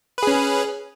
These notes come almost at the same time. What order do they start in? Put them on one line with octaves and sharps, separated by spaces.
B4 G#4 C#4